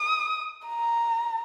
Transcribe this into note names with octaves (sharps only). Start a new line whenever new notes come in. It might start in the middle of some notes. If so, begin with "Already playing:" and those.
Already playing: D#6
A#5